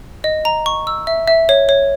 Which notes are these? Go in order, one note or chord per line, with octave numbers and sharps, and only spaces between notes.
D#5
A#5
C#6
E6
E5
E5
C#5
C#5